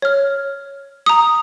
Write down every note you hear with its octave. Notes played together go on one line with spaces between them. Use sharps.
C#5 F6
A#5 D#6